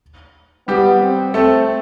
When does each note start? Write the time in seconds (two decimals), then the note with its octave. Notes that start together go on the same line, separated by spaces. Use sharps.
0.68 G3 B3 G4
1.01 C4
1.34 A3 C4 A4